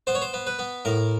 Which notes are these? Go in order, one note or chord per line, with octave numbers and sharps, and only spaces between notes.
B3 C5
C#5
C5
B3
B4
B3
A2 A#4